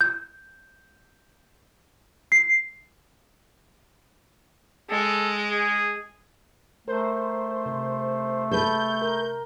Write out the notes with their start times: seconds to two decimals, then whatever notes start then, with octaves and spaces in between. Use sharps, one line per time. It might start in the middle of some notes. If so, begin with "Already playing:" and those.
0.01 G6
2.32 C7
4.90 G#3 A4
5.51 G#4
6.88 A3 A#4 C5
7.66 C3
8.51 A4 B4 G6
9.02 A#4